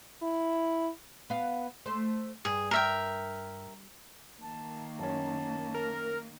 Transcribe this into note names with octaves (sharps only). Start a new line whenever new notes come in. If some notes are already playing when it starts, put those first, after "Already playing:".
E4
B3 F5
A3 C5
G2 G#4
A#4 E5 G5
D#3 A#3 A5
F#2 C#4 A5
A#4